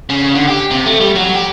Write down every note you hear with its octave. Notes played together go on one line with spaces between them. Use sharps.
C#3
D3
G4
C3
A3
G3
F#3
G4